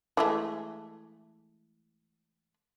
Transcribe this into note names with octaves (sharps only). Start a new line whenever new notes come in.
E3 G#3 A3